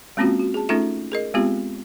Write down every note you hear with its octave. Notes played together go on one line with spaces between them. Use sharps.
G#3 A#3 C4 C#4 F4 F#4
F#4
G#4 A5
A3 C#4 D#4 F4 A4 E5
G#4 A#4 D#5
G#3 B3 C4 F4 G4